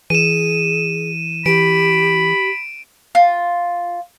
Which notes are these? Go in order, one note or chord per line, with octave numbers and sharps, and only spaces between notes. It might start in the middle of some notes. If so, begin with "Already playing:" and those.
E3 G#4 D#7 E7
E3 G4 B5 D7
F4